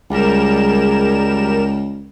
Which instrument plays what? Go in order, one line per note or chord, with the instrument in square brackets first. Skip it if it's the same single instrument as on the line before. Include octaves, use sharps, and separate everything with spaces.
[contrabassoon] C#2 [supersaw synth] G3 A#4 E7 [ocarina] G#4